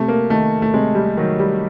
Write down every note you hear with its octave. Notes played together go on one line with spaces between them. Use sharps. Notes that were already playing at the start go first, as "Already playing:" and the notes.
Already playing: C3 A3
A#3
D#3 A3
A3
C3 G#3
G3
D#3 F#3
G3